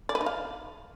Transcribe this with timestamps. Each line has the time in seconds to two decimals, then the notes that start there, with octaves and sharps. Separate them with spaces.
0.09 D5
0.15 B4
0.21 D#4
0.26 F5